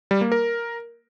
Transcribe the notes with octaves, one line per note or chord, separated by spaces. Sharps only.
G3
A#3
A#4